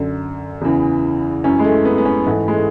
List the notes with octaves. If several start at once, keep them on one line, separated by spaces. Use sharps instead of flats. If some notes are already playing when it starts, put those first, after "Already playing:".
Already playing: F#2 D3
E2 C#3 E3
F#2 E3 C#4
G#3
A3
B3
B3
C#4
G#2 E3 A3
G#3
A3